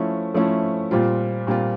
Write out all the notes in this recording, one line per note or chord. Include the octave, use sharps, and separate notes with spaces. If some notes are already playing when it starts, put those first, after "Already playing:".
Already playing: F3 A3 C#4 E4
F3 A3 C#4 E4
A#2 G3 C4 F4
A#2 G3 C4 F4